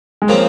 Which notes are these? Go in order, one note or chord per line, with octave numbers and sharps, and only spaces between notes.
G#3
C#3 F3 A#3 C4